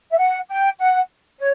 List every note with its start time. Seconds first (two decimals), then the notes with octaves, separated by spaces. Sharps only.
0.11 E5
0.18 F#5
0.49 G5
0.79 F#5
1.39 C#5